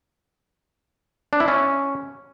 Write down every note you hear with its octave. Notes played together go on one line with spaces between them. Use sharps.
D4
E4
C#4